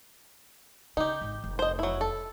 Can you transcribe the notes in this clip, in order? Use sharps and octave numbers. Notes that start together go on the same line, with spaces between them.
C#3 D#4 G4
G#1
F1
C5 D#5
F#3 E4
A4